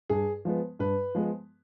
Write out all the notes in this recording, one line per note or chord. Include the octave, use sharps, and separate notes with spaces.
G2 G#4
F3 G#3 B3
G2 B4
F3 G#3 B3